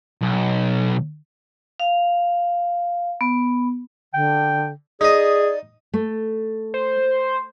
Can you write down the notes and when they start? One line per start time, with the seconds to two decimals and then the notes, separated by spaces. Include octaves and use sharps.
0.22 B1
1.79 F5
3.21 B3
4.14 D3 G5
5.01 D#4 G#4 D5 D#5
5.94 A3
6.74 C5